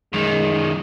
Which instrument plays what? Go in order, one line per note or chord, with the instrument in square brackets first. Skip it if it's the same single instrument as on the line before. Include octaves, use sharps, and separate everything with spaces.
[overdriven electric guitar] F#2 D#3 [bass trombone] G#3